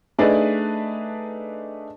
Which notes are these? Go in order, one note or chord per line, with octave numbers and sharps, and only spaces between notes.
A3 D4 D#4 G#4 B4 D5